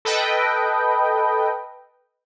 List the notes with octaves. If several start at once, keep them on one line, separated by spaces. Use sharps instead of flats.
A4 B4 D#5 G5